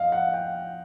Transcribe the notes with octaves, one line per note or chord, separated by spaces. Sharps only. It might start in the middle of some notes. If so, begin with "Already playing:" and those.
Already playing: F2 D#5 F5
F#5
G5